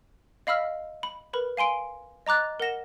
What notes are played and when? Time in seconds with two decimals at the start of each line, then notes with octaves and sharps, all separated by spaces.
0.47 D#5 F5 B5 E6 F6 B6
1.03 B5
1.33 A#4 B4 B5
1.57 F5 G#5 C6 D7
2.26 D#5 A#5 D6 F#6 A6
2.60 A#4 F#5 A#6 E7